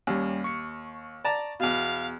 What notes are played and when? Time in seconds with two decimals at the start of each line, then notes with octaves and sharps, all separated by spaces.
0.07 D#2 G3 C#4
0.44 C#6 C#7
1.25 D5 A5 A#5
1.60 E2 B2 F5